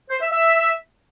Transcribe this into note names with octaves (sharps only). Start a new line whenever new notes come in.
C5
E5
E5